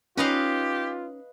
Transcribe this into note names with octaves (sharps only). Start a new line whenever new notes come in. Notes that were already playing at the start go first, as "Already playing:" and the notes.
C#4 D#4 F4 G4 B4 C#5 D#5 F5